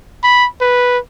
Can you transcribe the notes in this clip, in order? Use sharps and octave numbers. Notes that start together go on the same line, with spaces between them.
B5
B4